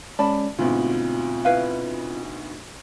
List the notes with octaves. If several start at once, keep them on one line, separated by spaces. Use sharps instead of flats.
G#3 C#4 D5 A5 B5
D2 G#2 B2 C4 F4
E4 B4 F5